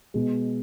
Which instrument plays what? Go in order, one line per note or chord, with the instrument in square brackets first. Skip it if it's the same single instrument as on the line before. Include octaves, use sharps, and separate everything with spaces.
[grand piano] B2 G#3